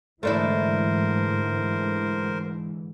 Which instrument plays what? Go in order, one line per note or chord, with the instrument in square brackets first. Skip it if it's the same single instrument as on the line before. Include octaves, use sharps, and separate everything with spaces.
[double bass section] G#2 D3 E3 [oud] A3 D4 E4 [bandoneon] A#4 C5